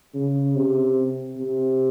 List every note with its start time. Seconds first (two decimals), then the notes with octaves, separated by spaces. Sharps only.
0.15 C#3
0.56 C3
1.37 C3